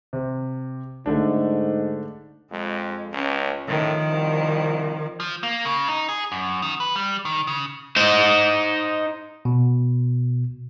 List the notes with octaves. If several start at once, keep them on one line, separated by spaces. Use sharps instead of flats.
C3
G#2 D3 A3 D4
F2 G#3
C#2 C#4
A2 D#3 F3
C2
F3
A#3
C#3
D#4
G#4
F#2
D#3
B4
G3
D#3
C#3
D#4 C5
B2